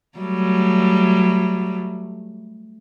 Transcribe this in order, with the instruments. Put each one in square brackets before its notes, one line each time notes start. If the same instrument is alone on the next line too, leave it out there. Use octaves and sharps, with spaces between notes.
[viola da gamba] F#3 G3 A3